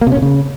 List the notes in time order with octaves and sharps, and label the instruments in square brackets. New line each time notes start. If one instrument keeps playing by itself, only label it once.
[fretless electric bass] A#3
C3
C#4
B2
C#3